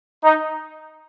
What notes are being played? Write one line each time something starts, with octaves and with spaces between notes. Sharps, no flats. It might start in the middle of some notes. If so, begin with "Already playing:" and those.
D#4